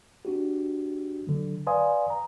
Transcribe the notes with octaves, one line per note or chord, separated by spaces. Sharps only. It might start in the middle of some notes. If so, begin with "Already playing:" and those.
D4 F#4 G4
D3 F#3
B4 D5 F5 G#5 C6 D#6
A#5